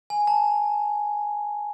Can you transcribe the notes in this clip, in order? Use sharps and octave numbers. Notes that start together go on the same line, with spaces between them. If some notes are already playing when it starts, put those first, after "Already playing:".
G#5
A5